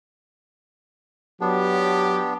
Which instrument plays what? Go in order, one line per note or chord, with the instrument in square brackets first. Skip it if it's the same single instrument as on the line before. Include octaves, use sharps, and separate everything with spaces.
[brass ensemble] F#3 G4 [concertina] B3 D4